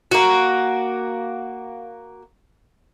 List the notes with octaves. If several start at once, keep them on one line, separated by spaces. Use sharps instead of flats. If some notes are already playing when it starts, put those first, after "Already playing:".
A#3 F#4